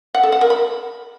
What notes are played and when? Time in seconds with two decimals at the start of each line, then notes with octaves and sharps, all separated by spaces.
0.15 F#5
0.23 A4
0.32 F#5
0.41 A#4
0.50 B5